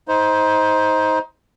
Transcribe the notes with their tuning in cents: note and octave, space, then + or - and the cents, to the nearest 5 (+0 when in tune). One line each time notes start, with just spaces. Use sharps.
D#4 +25 C5 +0